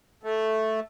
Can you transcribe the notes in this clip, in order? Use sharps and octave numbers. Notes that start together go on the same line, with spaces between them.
A3